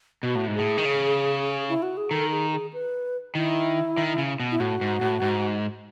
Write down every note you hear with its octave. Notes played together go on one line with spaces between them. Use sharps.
B2 F#4
A2
G#2
A2 G#4
D#3
C#3
E4
F#4
G#4
D#3 A4
G#4
G#4
B4
D#3 E4
D#3
C#3
B2
E4
A2 F#4
G#2
A2
G#2